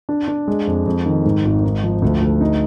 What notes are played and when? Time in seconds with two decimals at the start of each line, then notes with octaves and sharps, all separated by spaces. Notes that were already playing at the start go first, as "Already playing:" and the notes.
0.09 D4
0.28 D4
0.48 G#3
0.67 F2
0.86 F2
1.06 D#3
1.25 G#2
1.45 G#1
1.64 D#4
1.83 F3
2.02 D2
2.21 D2
2.41 D#4